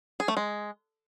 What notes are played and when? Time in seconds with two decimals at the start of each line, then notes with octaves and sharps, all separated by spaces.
0.20 G#4
0.28 A3
0.37 G#3